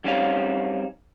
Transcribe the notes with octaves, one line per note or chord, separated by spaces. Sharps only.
F#2 G3 C4 C#4 D#4 F5